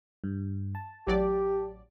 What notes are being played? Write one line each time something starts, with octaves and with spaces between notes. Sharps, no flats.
G2
A5
A1 F#3 G4 D5